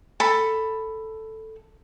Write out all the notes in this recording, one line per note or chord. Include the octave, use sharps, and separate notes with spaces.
A4 B5